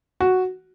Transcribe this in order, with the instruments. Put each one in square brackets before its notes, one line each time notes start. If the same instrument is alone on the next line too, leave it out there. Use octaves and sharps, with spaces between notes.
[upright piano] F#4